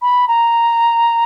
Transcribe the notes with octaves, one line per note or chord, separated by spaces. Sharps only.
B5
A#5